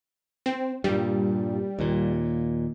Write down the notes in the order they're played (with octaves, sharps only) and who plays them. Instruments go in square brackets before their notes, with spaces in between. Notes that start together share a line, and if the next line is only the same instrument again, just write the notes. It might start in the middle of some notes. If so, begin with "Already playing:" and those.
[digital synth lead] C4
[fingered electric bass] G2 A#2 [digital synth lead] G3
[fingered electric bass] D#2 A#2